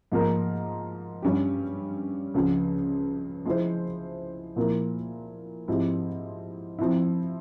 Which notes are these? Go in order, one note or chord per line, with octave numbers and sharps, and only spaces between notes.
G#2 F3 A#3 F4 A#4
G2 G3 C#4 G4
C#2 C#3 F3
F3 G#3 E4 G#4 C5
A#2 F3 A#3 E4 A#4
G#2 F3 C4 E4 G4
F3 C4 E4